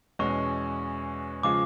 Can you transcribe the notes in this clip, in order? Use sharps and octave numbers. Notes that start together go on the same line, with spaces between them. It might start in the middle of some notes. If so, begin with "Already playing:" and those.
E2 B2 G#3 C#4 F#4 C#6
C#3 F3 G#3 D6